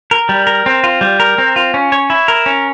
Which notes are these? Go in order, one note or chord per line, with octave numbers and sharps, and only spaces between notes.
A#4
G3
A#4
C4
F4
G3
A#4
C4
F4
C#4
C#5
E4
A#4
C#4